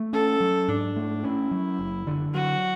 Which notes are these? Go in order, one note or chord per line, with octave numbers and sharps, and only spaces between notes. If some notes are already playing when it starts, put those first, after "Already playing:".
Already playing: A3
C#4 A4
F#3
G#2 D4
A3
C#4 E4
F#3
F#1
D3
F#3 F#4